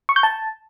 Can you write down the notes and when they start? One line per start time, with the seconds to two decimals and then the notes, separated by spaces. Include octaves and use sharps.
0.09 C#6
0.16 G6
0.23 A5